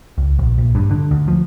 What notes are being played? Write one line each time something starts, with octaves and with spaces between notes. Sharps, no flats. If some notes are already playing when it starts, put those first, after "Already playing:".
C#2
A#1
A#1
G2
D3
D2
F3